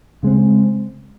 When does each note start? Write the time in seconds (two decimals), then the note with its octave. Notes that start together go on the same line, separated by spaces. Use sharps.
0.23 C#3 G#3 C4